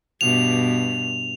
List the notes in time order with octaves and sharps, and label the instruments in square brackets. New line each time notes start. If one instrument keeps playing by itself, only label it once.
[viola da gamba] G2 B2 [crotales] F7